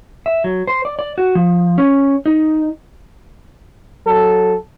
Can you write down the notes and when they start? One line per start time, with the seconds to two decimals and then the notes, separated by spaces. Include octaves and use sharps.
0.26 E5
0.44 F#3
0.67 C5
0.85 D5
0.99 D5
1.18 F#4
1.35 F3
1.78 C#4
2.26 D#4
4.05 F#3 A4